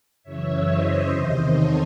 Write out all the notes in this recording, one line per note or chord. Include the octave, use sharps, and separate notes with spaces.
F#2 C#3 E3 C#5 E5
C5 D#5
E2 C3 D#3
A4 C#5